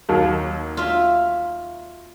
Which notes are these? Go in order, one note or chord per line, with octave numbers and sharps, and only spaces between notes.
D#2 F#3
F4 E5